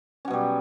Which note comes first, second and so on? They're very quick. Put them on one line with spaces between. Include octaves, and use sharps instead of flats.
C#4 F#3 B2 G3